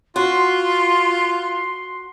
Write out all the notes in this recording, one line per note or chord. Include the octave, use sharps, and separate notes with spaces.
F4 F#4 C6